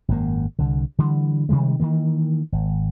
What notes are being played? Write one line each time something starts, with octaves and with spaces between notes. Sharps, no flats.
G#1 F#2 A#3
C2 D3
D3 E3 G3
C3 D#3 G3 G#3
D#3 E3 A#3
G#1